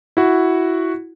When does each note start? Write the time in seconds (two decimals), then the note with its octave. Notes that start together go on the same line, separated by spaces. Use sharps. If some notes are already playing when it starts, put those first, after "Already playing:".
0.17 E4 F#4